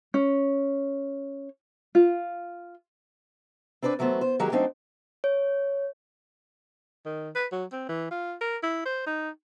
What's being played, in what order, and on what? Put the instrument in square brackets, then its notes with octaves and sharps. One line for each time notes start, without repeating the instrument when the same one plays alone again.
[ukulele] C#4
F4
[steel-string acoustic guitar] C4 D4 B4 C5 D5
E2 F#3 A3 B3 C5
C5
D#3 F#3 G#3 G4 G#4 A#4
F#3 A3 C4 D4 D#4 C5
[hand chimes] C#5
[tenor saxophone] D#3
B4
F#3
C4
E3
F4
A#4
E4
C5
D#4